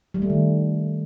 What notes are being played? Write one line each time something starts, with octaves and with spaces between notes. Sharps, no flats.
G3
A3
D#3